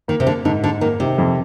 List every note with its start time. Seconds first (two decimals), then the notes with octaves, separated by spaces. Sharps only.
0.08 D#3 A#3
0.20 C3
0.27 D3 A#3
0.45 G#2 D3
0.63 G#2 D3
0.81 D#3 A#3
1.00 C3 D#3
1.18 F2